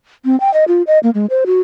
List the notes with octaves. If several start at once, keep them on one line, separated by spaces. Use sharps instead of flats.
C4
G5
D#5
F4
D#5
A#3
G#3
C5
F#4